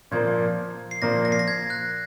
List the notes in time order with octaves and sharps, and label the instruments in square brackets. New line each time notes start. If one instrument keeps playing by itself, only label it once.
[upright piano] A#2 F3 A#3 [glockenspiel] G#6
[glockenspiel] C7
[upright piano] A#2 F3 A#3 [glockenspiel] A#6
[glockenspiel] A#6
C7
A#6
G#6
F#6